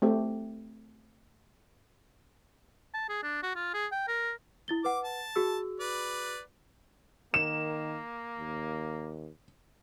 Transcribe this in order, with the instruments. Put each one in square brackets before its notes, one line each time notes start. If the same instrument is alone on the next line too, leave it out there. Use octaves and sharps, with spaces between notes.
[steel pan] A3 C4 G4 A4
[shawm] A5
G#4
D4
F#4
F4
G#4
G5
A#4
[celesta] E4 A6 G7
[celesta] B4 F#5 [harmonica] D6
[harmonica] A5
[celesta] F#4 G#4 E6
[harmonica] B4 D5
[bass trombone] D#3 [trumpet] A#3 [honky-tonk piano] E7
[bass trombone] D#2